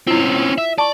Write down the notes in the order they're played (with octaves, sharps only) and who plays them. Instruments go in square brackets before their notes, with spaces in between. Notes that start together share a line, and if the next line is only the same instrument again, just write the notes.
[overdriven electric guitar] C4 C#4 [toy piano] E4 F4
[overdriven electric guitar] E5
[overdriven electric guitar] D5 [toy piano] A5 C#6